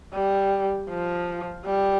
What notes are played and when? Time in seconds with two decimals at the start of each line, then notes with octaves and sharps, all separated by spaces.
0.13 G3
0.89 F3
1.65 G3